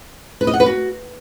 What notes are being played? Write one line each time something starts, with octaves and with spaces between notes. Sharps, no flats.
B4
D#5
F#5
B4
F#4